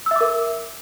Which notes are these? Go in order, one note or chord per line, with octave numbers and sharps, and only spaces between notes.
A#4 E5 D6 E6